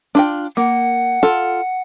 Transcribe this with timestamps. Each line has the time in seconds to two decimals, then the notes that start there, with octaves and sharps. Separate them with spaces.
0.15 D4 F4 G5
0.57 A#3 F#5
1.23 F4 A4